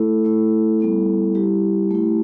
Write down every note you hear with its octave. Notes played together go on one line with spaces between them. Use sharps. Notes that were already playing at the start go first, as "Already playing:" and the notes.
Already playing: A3 E4 A4
A3 E4
G3 B3 E4
G3 E4 G4
A3 E4